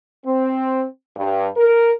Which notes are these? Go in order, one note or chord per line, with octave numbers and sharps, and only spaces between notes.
C4
G2
A#4